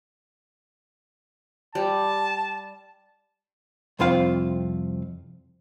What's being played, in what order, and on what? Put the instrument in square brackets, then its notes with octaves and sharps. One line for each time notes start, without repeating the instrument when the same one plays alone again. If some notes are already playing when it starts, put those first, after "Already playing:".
[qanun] G3 [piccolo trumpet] A5
[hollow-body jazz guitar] C2 F2 C4 F4 F5